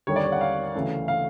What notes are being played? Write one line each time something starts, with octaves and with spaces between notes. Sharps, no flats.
D#2 D3 G3 C#5
D5
C#5
F#5
F5
D2 C#3 E3 A3
F5